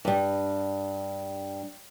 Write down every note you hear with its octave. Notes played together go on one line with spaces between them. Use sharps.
G2 G3